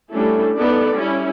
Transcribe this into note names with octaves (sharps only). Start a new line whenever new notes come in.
G3 A3 C#4 D4 E4 A4
B3 D#4 A4 D5
G3 C#4 E4